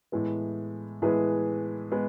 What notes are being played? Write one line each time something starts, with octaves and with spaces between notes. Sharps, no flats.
A2 E3 G#3 B3
A2 E3 G#3 B3 G#4 B4
G#3 B3